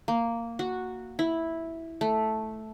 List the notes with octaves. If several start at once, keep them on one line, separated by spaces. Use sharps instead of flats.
A#3
F#4
E4
A3